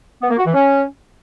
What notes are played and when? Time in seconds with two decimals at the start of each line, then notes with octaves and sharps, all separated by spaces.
0.22 B3
0.30 A#3
0.38 F#4
0.46 E3
0.54 C#4